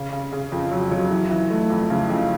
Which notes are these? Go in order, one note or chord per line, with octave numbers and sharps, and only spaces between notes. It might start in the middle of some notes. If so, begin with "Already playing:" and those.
Already playing: C#3
C#3
C#3
F2
F#3
F#3
E3
E3
A3
F2
C#3
F2